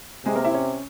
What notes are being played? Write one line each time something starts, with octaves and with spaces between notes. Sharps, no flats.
C3 G#3 G#4
A#3 A#4
E4 E5
C#4 C#5